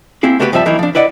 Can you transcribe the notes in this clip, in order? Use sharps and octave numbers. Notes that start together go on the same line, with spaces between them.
A#3 C4 E4 G#4
A3 B3 F#4 G4 A#4 B4
G2 F3 G3 B3 E5 A5
E3 F#3 A#3 D#4 E4
F3 D4
E4 B4 D5 D#5 F#5